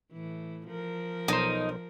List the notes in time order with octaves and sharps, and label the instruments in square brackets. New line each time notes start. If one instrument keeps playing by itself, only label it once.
[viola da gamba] A2 E3
F3 A#4
[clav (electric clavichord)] B1 C5 [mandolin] D#4